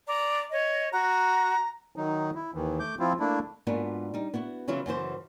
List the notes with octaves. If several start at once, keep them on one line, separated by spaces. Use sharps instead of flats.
D5 A#5
C#5 D#5
F#4 A#5
D#3 F#3 D#4
E4
D#2 D#3 E3
A3 D6 G6
F3 C4 E4 F4
A3 A#3 D4 E4
G#2 A#3 B3 D4 F4 F#4
G3 D#4
B3 E4 F#4
C#3 E3 F#3 E4 F4
F#2 C#3 E3 C5